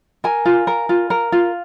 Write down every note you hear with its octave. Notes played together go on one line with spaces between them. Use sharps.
A#4 G#5
F4
A#4
F4
A#4
F4